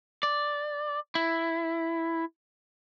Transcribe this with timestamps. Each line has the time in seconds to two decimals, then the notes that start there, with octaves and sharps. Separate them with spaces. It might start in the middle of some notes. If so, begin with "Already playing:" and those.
0.23 D5
1.15 E4